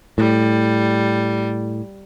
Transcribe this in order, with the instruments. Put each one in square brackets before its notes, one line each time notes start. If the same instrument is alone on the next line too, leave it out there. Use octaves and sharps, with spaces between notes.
[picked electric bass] A2 [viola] G3